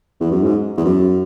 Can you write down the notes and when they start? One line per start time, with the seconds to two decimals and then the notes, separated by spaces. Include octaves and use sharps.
0.20 E2
0.31 F#2
0.43 G#2
0.77 E2
0.85 F#2